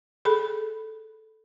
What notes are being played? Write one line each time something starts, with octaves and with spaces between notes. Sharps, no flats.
G#4 A4 B5